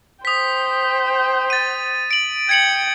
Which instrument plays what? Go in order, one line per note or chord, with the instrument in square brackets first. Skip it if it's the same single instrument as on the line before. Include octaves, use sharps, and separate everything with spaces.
[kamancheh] C5 G5 [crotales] D#6 B6
[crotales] A6 D#7
D7 F#7
[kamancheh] G5 [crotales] G#6 C#7 F#7